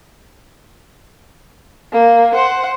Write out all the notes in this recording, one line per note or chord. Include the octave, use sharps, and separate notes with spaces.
A#3
C5 F#5